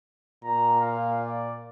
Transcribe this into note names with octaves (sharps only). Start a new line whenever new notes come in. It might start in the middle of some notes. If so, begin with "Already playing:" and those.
A#2 A#5
F5
D5